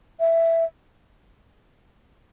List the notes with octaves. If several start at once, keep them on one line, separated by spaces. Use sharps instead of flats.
E5